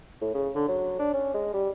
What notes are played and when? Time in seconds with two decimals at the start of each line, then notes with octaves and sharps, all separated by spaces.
0.22 A2
0.34 C#3
0.55 D3
0.68 F#3
0.99 D4
1.14 C#4
1.34 G#3
1.54 G3